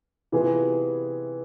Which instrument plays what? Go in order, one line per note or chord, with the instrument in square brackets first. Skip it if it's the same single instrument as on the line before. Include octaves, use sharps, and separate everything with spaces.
[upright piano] C3 E3 B3 F4 G#4